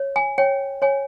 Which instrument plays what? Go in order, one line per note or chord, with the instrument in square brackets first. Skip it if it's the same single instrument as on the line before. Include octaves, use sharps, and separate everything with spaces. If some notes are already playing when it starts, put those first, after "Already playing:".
Already playing: [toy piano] C#5
G#5
C#5 G5
C#5 G#5